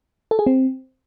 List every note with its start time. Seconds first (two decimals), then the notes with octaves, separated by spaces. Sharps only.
0.31 A4
0.39 G#4
0.46 C4